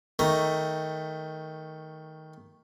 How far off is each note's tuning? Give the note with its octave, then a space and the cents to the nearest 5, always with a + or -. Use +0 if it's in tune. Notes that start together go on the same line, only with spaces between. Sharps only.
D#3 +15 A3 +10 A#5 +5